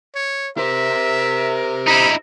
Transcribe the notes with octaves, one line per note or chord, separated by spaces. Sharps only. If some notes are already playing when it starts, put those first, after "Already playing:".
C#5
G4 A#4 C5 E5
D#4 E4 B5